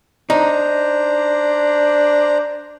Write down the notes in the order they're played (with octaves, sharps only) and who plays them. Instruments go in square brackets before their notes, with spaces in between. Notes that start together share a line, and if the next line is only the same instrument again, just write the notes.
[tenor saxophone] D4 [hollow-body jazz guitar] D#4 [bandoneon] C5 A#5